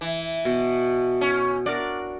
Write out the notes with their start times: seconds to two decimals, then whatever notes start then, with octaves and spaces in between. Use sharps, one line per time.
0.01 E3
0.45 B2
1.21 C#4
1.66 D4 F#4 A#4 D5